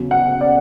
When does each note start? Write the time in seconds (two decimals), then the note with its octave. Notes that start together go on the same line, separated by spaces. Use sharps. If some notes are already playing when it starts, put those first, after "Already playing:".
Already playing: E2 C#3 F#3
0.11 F#5
0.41 D5